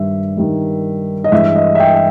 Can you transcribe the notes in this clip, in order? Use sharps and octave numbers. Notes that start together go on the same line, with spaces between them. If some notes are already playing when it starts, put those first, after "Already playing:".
Already playing: G2 D#3 G3 E5
G2 D#3 G3
D#5
G2 E3 G#3 E5
D#5
E5
G5
G5